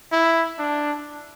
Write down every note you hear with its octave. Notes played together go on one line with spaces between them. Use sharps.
E4
D4